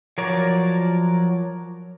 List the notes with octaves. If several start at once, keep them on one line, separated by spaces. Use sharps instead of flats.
F3 F#3 A#4 C#5 D5